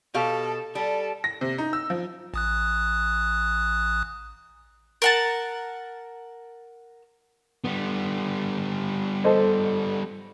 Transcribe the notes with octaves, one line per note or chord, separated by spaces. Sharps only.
B2 G4 A4 F5
G3 A4
A#6
C3
D#4
E6
F3
A1 D#6 F#6
A#4 F#5 A5
G3 B3
A4 C5 D#5